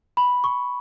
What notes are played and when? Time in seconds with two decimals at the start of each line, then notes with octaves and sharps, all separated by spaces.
0.17 B5
0.44 C#6